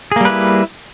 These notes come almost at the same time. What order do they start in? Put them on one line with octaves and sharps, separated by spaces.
G#4 A#3 G3 B4 E4